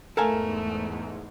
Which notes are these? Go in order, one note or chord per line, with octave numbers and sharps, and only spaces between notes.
E2 G#2 A3 A4 A#4 F5 G#5